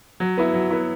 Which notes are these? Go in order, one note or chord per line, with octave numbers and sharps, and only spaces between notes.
F#3
B3 E4
F#3
B3 E4